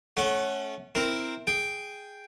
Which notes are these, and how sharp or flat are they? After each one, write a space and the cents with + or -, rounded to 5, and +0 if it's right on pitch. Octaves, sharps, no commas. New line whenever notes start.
A3 -30 C#4 -10 F#5 +15
C4 +0 E4 +0 A#4 +0
G#4 +0 G5 +0